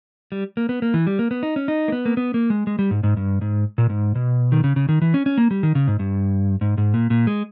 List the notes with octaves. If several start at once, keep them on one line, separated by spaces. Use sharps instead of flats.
G3
A#3
B3
A#3
E3
G3
A#3
B3
D#4
C#4
D#4
A#3
B3
A#3
B3
A#3
G#3
G#3
G3
G#2
G#2
G2
G#2
A#2
G#2
B2
D#3
C#3
C#3
D#3
E3
C#4
C#4
A#3
G3
D#3
C#3
G#2
G2
G#2
G#2
A#2
A#2
G#3